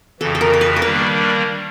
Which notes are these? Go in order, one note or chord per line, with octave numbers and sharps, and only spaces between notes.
F2 C#3 E3 A4
A4
A#4
A#4
B4
A#4
D#3 G3 A#3 D4 B4